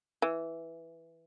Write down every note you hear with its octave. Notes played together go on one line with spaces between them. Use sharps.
E3